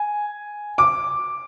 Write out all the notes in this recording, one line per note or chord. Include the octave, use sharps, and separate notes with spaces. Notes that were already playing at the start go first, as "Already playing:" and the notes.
Already playing: G#5
D6